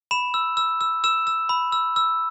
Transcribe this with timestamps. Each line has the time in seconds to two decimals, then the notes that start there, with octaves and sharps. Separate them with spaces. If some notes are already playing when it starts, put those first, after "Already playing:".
0.11 B5 E7
0.34 E6
0.57 E6
0.81 E6
1.04 E6 E7
1.27 E6
1.49 B5
1.72 E6
1.96 E6